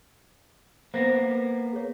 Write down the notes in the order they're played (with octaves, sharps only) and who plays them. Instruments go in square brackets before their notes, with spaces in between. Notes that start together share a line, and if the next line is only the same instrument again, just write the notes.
[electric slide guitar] A#3 B3 [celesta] C5 A#6
[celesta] G#4 C#5